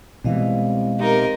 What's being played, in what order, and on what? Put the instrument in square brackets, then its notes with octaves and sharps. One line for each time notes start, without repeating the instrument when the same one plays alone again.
[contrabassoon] C2 [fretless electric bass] B2 E3 [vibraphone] G#3 D#5 F5
[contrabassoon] C3 [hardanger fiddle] D#4 A#4